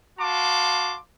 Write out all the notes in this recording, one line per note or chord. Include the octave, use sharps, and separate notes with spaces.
F#4 F5 A5 C6 D6